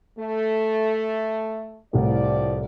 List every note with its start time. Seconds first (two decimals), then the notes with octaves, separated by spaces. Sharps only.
0.18 A3
1.93 C2 A2 F3 D5